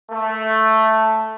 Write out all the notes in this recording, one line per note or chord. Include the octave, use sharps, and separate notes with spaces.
A3